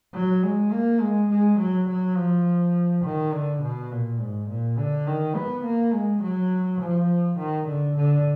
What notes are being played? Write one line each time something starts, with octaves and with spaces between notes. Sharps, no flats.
F#3
G#3
A#3
G#3
G#3
F#3
F#3
F3
D#3
D3
B2
A#2
G#2
A#2
D3
D#3
B3
A#3
G#3
F#3
F3
D#3
D3
D3